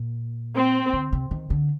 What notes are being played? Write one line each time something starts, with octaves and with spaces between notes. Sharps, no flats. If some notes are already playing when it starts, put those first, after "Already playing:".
Already playing: A#2
C4
D3
C3
D#3
D3